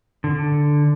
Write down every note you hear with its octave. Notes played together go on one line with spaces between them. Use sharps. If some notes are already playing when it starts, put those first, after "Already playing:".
D3